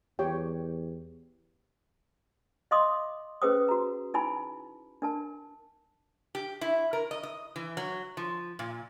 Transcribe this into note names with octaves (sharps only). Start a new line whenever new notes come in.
E2 G4 C#5 G5
D#5 F5 C6 D6 D#6
C#4 G#4 B4 C5 G5 D#6
F#4 A#5
D#4 E4 G#5 B5
D4 A#4 A5
G4
E4
A#4
D#5
D#5
E3
F#3
F3
A#2